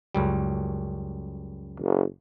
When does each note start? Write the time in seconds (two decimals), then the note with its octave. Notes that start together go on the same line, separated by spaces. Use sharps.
0.15 C#2 F#2 G3
1.80 F#1